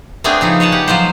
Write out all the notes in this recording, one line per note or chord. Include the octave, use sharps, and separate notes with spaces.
A3 B3 C4 D4 G#4
C#3 F3 D#4
C#5 D#5 F#5 A5
G4 F#5
F3 F#3 F4 C5